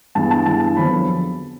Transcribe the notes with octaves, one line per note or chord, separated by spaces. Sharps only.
G2 E3 G#3 B3 A5
A5
G2 E3 G#3 B3 A5
F2 D3 F#3 B3 B5